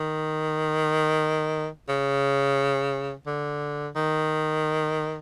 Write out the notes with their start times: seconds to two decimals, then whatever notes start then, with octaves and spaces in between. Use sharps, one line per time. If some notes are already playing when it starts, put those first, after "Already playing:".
Already playing: D#3
1.89 C#3
3.27 D3
3.96 D#3